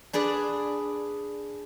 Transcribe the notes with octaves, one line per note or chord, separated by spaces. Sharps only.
D4 G#4 B4 D5